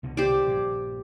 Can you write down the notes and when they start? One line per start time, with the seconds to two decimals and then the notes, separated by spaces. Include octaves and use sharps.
0.03 C2 B2 D3
0.17 G4 C5 D5
0.46 A#1 G2